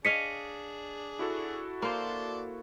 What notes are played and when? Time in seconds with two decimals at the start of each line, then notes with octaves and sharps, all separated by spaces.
0.05 D4 G#4 C#5 D#5 F5 B6 C#7
1.19 E4 F#4 A4
1.82 A#3 C5 D5 A5 C6